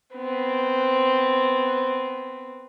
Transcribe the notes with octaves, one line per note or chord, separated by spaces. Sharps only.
B3 C4